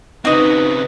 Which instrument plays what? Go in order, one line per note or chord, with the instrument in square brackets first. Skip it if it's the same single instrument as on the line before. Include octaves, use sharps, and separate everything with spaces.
[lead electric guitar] C#3 C4 [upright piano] D#4 [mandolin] F#4 D#5 [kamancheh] B4